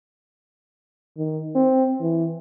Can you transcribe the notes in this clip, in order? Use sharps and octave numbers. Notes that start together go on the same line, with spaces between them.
D#3
C4
E3